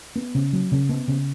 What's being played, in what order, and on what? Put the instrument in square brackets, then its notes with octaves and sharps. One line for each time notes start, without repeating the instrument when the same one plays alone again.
[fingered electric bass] B3
C#3
F#3
C#3
B3
C#3